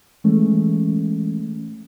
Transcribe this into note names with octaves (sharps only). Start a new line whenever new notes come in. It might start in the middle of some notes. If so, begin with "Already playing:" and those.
E3 G#3 A3 C#4